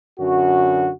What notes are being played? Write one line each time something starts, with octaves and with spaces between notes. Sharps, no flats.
F#2 D3 F#4